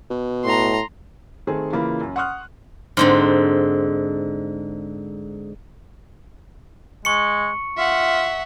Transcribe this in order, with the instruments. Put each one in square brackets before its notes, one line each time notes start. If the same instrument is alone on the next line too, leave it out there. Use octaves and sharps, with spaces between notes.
[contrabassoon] B2
[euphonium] A2 [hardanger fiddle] A#5 C6
[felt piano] D#3 A3 C4 G#4
C#3 E3 A#3 F4 B5
F#2
F#5 C6 C#6 D#6 F6 F#6
[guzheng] G#2 D3 C4
[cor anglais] G#3 [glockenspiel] C#6 C#7
[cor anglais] F4 [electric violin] E5 F#5